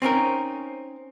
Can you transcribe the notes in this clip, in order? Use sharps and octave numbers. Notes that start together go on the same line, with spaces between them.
C4 C#4 D#4 A#4